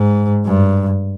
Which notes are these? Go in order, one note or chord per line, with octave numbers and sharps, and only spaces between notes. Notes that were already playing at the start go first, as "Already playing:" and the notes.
Already playing: G#2
G2